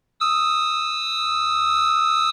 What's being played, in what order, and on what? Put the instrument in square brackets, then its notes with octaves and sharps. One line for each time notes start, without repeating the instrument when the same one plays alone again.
[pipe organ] D#6 E6